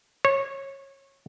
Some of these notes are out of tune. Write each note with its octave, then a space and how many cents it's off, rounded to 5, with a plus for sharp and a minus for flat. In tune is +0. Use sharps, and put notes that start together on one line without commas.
C#5 -20